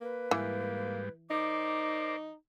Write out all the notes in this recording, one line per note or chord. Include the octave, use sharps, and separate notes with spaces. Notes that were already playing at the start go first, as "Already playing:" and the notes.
A#3 B4
G#2 E3 G3 A#3
D#4 A#4 C5 D5 D6